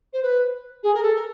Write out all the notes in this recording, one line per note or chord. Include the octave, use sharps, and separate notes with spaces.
C5
B4
G#4
A#4
A4
A#4